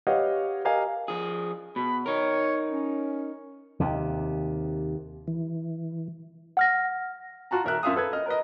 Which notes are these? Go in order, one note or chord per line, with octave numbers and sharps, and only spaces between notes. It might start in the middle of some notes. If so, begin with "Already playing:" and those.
G4 B4 C#5 D#5 F5 F#5
G4 A#4 D#5 F5 G#5
F3 G#4
B2 B5
D#4 A#4 C#5
C#4
D#2 C3
E3
F#5 F6 A#6
F4 F#4 A5 A#5
D#1 A#4 E5 F#6
F#2 F4 E5 F5 D#6
A4 B4 G#6
D#5 F6
A#4 B4 D#5